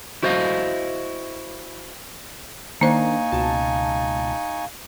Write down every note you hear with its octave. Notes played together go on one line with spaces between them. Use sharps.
E4 F#4 C5 D5 D#5 F5
D#3 A#3 D4 D#4 C5 F5 G#5 C#6
C#2 B2 A5